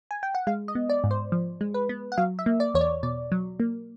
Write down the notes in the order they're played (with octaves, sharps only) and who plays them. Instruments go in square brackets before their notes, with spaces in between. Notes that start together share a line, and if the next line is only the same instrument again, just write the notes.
[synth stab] G#5
G5
F#5
G#3 F5
D#5
B3
D5
G#2
C5
F3
G#3
B4
B3
F#5
F#3 F5
E5
A#3
D5
E2 C#5
D5
B2 D5
F#3
A#3